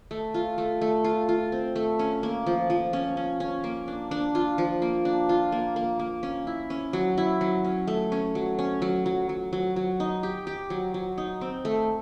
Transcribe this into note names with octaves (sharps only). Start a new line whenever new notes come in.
A3
F4
A3
A3
F4
F4
C4
A3
C#4
A#3
F3
F3
C#4
C#4
C#4
A#3
D4
D4
F4
F3
A#3
D4
F4
A#3
A#3
A#3
C#4
E4
C#4
F#3
E4
F#3
C#4
A3
C#4
F#3
C#4
F#3
F#3
F#3
F#3
F#3
D#4
G4
G4
F#3
F#3
D#4
C4
A3